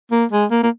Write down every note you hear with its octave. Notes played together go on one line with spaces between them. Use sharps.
A#3
G#3
A#3
A#3